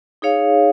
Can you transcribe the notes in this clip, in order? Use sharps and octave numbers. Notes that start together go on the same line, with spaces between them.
D#4 G#4 C#5 F5